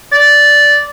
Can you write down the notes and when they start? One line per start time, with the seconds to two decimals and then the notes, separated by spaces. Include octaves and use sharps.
0.12 D5